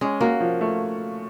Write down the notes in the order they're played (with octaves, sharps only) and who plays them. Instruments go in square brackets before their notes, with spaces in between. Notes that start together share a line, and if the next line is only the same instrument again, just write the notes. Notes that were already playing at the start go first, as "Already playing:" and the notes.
[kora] G#3 [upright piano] C#4
[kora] A#3 [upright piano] F#4
[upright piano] F3
A3